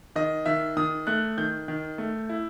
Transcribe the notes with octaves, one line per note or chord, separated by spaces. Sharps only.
D#3 D#5
D#3 E5
D#3 D#6
A3 F#6
D#3 G6
D#3
A3
E4